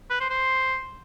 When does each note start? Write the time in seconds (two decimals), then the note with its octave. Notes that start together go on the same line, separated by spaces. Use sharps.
0.10 B4
0.20 C5
0.30 C5